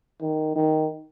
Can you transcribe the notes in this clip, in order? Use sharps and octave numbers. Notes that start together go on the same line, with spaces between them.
D#3
D#3